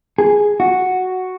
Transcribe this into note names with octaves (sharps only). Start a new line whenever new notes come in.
G#4
F#4